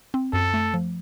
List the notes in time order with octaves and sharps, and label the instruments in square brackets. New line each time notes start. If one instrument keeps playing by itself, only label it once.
[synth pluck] C4
[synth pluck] F#2 [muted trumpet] A4
[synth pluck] A3
F3